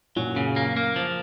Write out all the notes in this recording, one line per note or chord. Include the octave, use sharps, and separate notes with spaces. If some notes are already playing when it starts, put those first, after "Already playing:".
F#2 A#2 F#3
C#3
A#3
A#3
F3